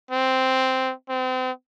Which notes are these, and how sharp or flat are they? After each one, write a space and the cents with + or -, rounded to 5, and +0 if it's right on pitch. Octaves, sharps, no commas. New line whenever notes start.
C4 -5
C4 -35